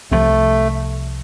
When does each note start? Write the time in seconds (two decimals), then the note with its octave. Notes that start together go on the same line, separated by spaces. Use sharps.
0.11 C2 C3 F3 A3